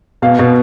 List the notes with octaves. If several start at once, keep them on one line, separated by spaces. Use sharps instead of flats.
B2 F5
B2